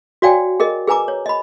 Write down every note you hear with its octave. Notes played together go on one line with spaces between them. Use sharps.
F#4 C#5 D5 F5 G5 G#5
G#4 A#4 D#5
G#4 B4 G#5 A#5 D6
C#5
D#5 B5